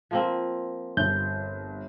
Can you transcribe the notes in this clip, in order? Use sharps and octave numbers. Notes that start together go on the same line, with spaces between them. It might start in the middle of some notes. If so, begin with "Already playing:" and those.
F3 A#3 C4
G1 G6